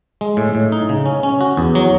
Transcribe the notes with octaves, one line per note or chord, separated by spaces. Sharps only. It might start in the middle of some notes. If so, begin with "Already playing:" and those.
G#3
A2
A2
D#4
C#3
C#4
C#4
F#4
E2
F#3